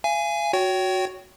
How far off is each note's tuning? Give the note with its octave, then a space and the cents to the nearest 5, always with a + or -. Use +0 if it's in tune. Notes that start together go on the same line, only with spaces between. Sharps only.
F5 -40 G#5 +0
F#4 -5 C#5 +20 G5 -25